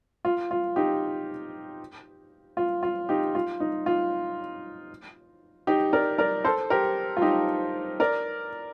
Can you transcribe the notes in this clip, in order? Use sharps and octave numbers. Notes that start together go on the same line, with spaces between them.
F4
F4
D#4 G4
F4
F4
D#4 G4
F4
D#4
F4
D#4 G4
A#4 D5
A#4 D5
A4 C5
G4 A#4
F4
D#4 G4
A#4 D5